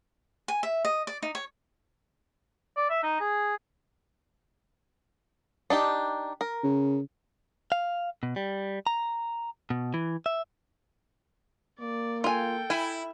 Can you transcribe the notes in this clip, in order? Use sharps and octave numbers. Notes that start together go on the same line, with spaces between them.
G#5
E5
D#5
D5
D#4
C#5
D5
E5
D#4
G#4
D4 D#4 G4
A#4
C#3
F5
B2
G3
A#5
B2
E3
E5
A#3 D5
F4 A4 G5 G#5
E4 G#5